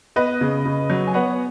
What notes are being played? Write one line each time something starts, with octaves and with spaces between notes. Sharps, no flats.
B3 B4 D#5
C#3
C#3
F#3
G#5
B3 C#5 F#5